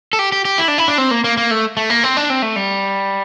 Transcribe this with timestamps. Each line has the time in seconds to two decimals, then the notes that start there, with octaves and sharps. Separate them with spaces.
0.13 A4
0.19 G4
0.32 G4
0.45 G4
0.58 E4
0.68 D4
0.78 E4
0.88 D4
0.98 C4
1.11 A#3
1.24 A#3
1.37 A#3
1.51 A3
1.77 A3
1.90 A#3
2.04 C4
2.17 D4
2.30 C4
2.42 A3
2.56 G3